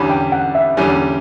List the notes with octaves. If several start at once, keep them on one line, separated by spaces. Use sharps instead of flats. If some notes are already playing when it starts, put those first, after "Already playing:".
Already playing: E2 D3 G3 C#4 B5
G5
F#5
E5
E2 D3 G3 C#4